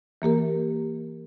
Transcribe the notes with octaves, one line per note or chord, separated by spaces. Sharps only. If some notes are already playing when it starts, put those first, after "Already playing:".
E3 A#3 G4 A#4